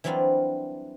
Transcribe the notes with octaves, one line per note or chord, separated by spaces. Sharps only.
E3 F#3 G3 C4 D4 F4